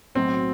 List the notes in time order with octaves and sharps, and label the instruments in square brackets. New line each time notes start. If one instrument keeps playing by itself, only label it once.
[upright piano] B1 A2 F#3 C4